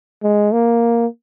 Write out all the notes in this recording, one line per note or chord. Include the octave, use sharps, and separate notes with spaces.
G#3
A#3